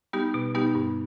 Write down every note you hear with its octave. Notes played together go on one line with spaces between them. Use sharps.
G3 B3 D#4 G4
B2
G3 B3 D#4 G4
G2